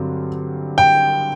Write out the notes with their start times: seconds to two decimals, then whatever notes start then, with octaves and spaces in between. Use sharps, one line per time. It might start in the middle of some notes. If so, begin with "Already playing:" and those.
Already playing: G2 D3 F#3 C4
0.78 G5